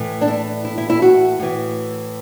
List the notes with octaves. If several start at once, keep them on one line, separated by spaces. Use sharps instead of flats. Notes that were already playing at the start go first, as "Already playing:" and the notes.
Already playing: A2 E3
D4
E4
E4
E4
E4
F#4
A2 E3